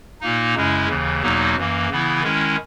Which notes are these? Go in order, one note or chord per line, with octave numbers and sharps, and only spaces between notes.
A#2 A#3 D#4
F#2 C#3 G#3 C#4 E4
D#2 C#3 E3
E2 B2 F#3 A#3 D#4
F#2 E3 A#3
C#3 E3 B3 E4
D#3 G#3 C#4 E4